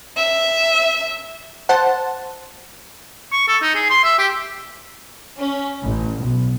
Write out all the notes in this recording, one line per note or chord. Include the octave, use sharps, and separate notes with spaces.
E5
C5 F#5 A5
C#6
A4
D#4
G#4
C6
E5
G4
C#4
A1
B1